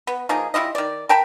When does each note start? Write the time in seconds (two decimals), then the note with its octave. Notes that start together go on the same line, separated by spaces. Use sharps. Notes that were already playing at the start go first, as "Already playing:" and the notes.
0.07 B3
0.29 F3 A#3 D#4 G#4
0.54 G3 E4 F4 D#5
0.75 D#3 D5
1.09 A#4 G5 A5 B5